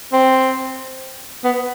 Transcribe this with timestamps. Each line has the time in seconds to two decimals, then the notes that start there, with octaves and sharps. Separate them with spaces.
0.13 C4
1.44 B3